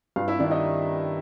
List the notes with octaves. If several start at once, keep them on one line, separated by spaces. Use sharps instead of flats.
G2 F4 F5
E4 E5
D#3 D4 D5
D#4 D#5